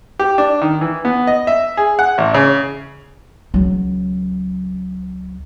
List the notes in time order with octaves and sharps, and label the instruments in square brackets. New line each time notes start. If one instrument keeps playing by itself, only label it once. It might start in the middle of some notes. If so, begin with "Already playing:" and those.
[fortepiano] G4
D4
D#3
E3
B3
D#5
E5
G#4
F#5
A1
C#3
[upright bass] C#2 F#3